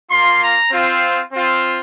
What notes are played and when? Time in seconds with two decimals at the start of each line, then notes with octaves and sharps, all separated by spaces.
0.11 A#3 F4 C6
0.41 A#5
0.72 C4 F4
1.32 C4 F4